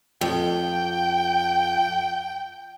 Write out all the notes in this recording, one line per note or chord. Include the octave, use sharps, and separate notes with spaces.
F2 G5